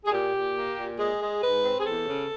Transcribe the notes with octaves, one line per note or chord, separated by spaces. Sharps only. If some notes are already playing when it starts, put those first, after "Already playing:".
G#4
A#2 G4
A#2
A#3
A#2
G#3 G#4
G#3
G#2 B4
C4
G#4
E2 A4
C#3